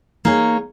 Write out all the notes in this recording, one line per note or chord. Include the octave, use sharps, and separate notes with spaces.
A#3 D#4 G#4 C#5